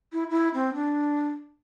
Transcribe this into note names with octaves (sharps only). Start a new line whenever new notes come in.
E4
E4
C4
D4